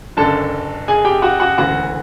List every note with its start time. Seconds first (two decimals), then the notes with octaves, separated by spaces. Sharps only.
0.17 F#1 F#2 D3 A4 A5
0.88 G#4 G#5
1.05 G4 G5
1.22 F#4 F#5
1.40 F#4 F#5
1.58 E1 D2 C#3 E3 F#4 F#5